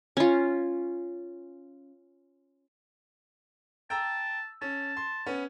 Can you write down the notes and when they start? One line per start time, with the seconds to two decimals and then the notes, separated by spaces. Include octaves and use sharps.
0.17 C#4 F4
3.90 G5 A5 A#5 E6
4.62 C#4 A5
4.97 C6
5.26 B3 C#4